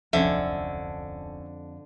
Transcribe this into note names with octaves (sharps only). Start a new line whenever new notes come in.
D1 C2 F2 D3 C#4 E5